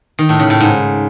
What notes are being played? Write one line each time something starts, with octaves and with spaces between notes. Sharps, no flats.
D#3
A2
C#3
A2
G#2